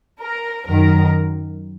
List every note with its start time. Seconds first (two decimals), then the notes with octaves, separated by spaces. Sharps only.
0.20 A#4
0.67 F#2 D#3 A#4